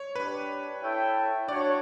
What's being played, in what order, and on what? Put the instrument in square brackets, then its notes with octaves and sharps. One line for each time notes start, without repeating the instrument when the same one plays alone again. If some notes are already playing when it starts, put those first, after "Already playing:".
Already playing: [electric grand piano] C#5
[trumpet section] D4 G4 D5 [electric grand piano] B4
[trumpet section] E4 A4 C#5 E5 G5
[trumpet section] D4 F#4 C#5 [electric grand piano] D5